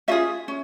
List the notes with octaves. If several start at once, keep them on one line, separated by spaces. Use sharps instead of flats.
C#4 F4 G#4 E5
C#4